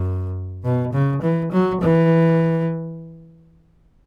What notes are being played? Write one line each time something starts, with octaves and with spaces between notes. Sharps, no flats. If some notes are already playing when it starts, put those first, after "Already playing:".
Already playing: F#2
B2
C#3
E3
F#3
E3